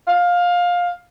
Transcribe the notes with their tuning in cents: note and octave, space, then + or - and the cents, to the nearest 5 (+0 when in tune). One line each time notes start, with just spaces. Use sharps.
F5 +15